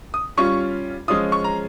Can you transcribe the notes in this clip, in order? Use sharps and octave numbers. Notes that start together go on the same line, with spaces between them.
D#6
G3 C#4 F4 C#6
F3 G#3 C#4 F4 D#6
C#6
A#5